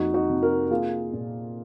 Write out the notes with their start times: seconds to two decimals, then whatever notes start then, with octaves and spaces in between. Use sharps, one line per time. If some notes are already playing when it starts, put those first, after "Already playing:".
Already playing: F2 A#3 D#4 F#4
0.14 D#4 F#4
0.29 C3
0.42 F#4 A#4
0.71 A#3 F4 G#4
1.13 A#2